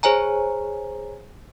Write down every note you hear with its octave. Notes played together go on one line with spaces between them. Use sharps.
G#4 C5 C#5 G#5 A#5